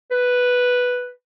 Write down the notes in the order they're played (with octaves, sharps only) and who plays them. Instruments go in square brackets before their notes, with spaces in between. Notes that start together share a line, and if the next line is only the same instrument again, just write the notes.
[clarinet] B4